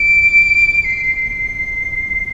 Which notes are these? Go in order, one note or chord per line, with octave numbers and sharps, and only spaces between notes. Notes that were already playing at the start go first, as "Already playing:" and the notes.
Already playing: D7
C7